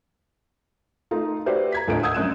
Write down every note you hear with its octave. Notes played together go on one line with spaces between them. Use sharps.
A3 D#4 F4
F#4 G4 B4 C5 D5 E5
A#5 G#6 B6
D#1 D2 A2 F4 D#5 D7
F#5 D#6 E6 G6 G#6
A#1 F#2 F#6 E7